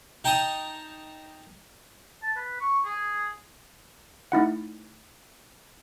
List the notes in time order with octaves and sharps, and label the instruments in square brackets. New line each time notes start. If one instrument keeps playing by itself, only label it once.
[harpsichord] D#4 G5 A5 A#5 D#6
[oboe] A5
B4
C#6
G#4
[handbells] A3 D#4 E4 F#5